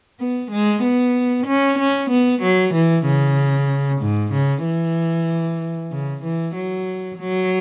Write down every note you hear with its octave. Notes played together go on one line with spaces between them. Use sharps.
B3
G#3
B3
C#4
C#4
B3
F#3
E3
C#3
G#2
C#3
E3
C#3
E3
F#3
F#3